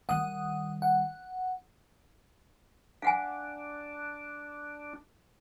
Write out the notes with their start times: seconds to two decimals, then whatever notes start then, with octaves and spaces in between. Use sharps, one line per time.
0.09 D#3 G3 F#5 D#6
0.82 F#5
3.02 D4 F5 F#5 G#5